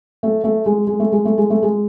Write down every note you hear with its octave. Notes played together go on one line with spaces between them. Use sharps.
A3
A3
G#3
G#3
A3
G#3
A3
G#3
A3
G#3